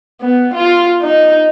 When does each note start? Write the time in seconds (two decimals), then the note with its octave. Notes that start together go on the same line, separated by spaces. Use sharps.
0.21 B3
0.54 F4
1.02 D#4